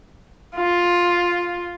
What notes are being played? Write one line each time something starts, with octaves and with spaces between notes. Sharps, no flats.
F4